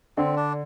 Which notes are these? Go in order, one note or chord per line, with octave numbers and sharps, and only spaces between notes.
D3 C4
D4